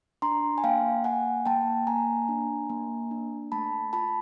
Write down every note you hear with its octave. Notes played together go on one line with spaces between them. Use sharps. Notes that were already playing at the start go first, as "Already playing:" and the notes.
D4 A#5 C6
G#5
A#3 F5 G5
A#3 F#5 G#5
A#3 G5 A5
A#3 G#5 A#5
D4
A#3
D4
A3 A5 B5
F4 A5 B5